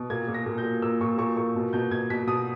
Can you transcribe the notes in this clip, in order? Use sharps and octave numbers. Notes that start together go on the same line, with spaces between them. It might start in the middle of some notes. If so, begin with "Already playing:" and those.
Already playing: B2
A#2 G#6
A#2
A#6
A#2
G6
A#2
A#2 E6
A#2 C#6
A#2 C#6
A#2 C#6
B2
B2 G6
B2 G#6
B2 B6
B2 D#6